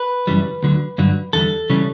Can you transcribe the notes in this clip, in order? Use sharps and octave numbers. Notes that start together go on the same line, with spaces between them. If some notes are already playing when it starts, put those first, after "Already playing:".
Already playing: B4
F#2 C#3 E3 G3
D2 D3 F#3
G2 D3 F#3
E2 D3 G3 A4
C#3 E3 G3